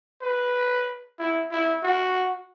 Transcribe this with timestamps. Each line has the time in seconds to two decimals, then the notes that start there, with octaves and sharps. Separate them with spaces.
0.22 B4
1.19 E4
1.51 E4
1.83 F#4